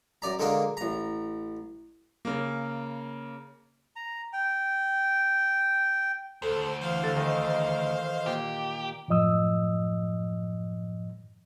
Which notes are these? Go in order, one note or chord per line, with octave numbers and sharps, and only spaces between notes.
F#2 D5 A#5
D3 G#3 A#3 D4 A#4
A1 A#5
C#3 A#3
A#5
G5
D2 A4 C5
E3 C5 F5
D3 A4
D#3 E3 A4 D#5
A#2 G4
F#2 A2 F3 D#5 D#6 E6